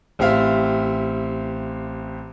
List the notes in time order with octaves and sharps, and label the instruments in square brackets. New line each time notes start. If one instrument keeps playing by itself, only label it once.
[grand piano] A1 C4 G4 E5 F5 F6